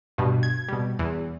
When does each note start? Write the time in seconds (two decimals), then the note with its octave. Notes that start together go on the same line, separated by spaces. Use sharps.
0.18 G2 B2
0.43 G#6
0.69 B2 G3
0.99 E2